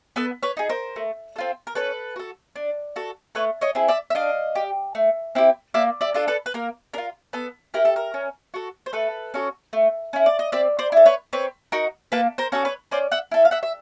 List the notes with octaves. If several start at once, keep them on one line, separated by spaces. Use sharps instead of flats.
B3 A4 B4
B4 C#5
D#4 G#4
A#4 C5
A3
C4 F4 A4
A#4
C#4 A4 B4
F#4 A4
D4
F#4 A4
A3 B4 C#5
C#5 D#5
C4 E4 G#4
D5 E5
E5
D4 D#5 F5
G4
A3
C4 E4 G4
A#3 D5 E5
D5 E5
D4 F4 A4
A4 B4
B4
A#3 A#4
D4 F4 A#4
B3 A4
E4 G4 A#4
A4
A#4
C#4
F#4 A4
C5
A3 A4 B4
C#4 F#4 A4
A3
C#4 E4
D5
D#5
C4 D5 E5
C5 D5
E4 A4
B4 C#5
C4 B4 C#5
D#4 F#4 A#4
A#3 A4 B4
A#4 C5
C#4 F#4 A4
B4 C#5
C#4 C5 D5
E5 F#5
E4 A4
F5
E5 F#5
E5